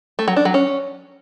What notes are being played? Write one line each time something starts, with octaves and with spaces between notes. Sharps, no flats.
A3
F#3
D4
F#3
C#4